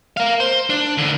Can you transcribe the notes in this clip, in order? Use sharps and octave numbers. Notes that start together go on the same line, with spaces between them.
A#4 F5
C5
D4
D#2 D3